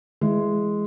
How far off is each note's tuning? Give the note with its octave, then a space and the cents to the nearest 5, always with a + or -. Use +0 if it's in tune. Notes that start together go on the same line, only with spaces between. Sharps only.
E3 +20 G#3 +0